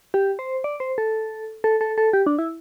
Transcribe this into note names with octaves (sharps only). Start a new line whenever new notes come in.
G4
C5
D5
C5
A4
A4
A4
A4
G4
D4
E4